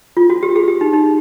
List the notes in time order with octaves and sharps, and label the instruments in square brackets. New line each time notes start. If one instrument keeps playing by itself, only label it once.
[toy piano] F4
F#4
G4
G#4
G4
D#4
D#4